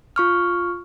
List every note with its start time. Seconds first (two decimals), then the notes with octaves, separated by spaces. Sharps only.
0.16 F4 C#6 F6